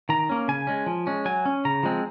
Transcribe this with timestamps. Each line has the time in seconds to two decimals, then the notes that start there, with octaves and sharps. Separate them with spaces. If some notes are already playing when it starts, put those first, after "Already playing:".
0.09 D#3 A#5
0.29 A#3 C#4
0.48 C#3 G#5
0.67 G#3 C#4
0.86 F3
1.07 G#3 C#4
1.25 F#3 G#5
1.46 C#4
1.65 C#3 A#5
1.83 F3 G#3 C4